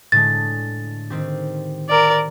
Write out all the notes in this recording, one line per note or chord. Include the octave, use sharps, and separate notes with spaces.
A2 D3 G#3 A6
D#3 C4 G4
A#4 D5